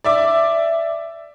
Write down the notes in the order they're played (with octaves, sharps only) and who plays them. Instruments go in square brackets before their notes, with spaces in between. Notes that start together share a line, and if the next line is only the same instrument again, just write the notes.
[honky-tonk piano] D5 E5 D6